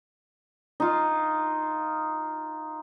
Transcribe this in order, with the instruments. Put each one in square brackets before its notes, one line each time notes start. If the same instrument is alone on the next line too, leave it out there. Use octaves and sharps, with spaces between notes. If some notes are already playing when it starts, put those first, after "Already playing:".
[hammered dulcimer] D#4 F4